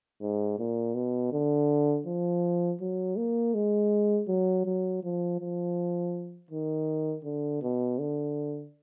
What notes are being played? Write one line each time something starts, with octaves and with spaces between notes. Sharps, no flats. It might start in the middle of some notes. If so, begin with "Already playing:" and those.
G#2
A#2
B2
D3
F3
F#3
A#3
G#3
F#3
F#3
F3
F3
D#3
D3
B2
D3